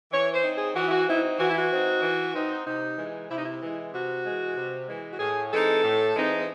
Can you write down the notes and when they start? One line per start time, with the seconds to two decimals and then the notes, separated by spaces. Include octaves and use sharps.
0.11 E3 C#5
0.33 C5
0.43 C4 D#4
0.54 G#4
0.75 E3 F#4
0.87 E4
0.91 F#4
1.07 C4 D#4 E4
1.39 E3 F#4
1.48 E4
1.57 F#4
1.70 C4 D#4
2.02 E3
2.33 C4 D#4
2.65 C3 D#4
2.97 E3 G#3
3.29 C3 E4
3.36 D#4
3.43 E4
3.61 E3 G#3
3.92 C3 F#4
4.25 E3 G#3
4.56 C3
4.88 E3 G#3
5.11 F#4
5.19 A2 G#4
5.51 E3 G#3 C4 D#4 A4
5.83 A2
6.15 E3 G#3 C4 D#4